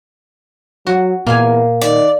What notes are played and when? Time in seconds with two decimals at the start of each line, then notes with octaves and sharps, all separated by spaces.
0.87 F#3 F#4
1.27 E2 A#2 A#3 F5 G#5
1.81 D#3 D5